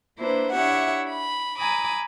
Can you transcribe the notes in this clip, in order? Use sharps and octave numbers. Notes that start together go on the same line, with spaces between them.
A#3 D4 E4 B4 C5
D4 E4 G4 C#5 E5 F#5
B5
G#5 A#5 B5 D6 D#6